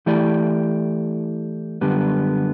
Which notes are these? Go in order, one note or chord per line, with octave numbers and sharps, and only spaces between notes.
E3 A3 E4 G4 D5
F#2 D3 G3 B3